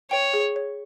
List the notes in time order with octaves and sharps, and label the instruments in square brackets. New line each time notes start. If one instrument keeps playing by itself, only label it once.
[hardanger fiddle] C#5 [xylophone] G5
[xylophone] G#4
C#5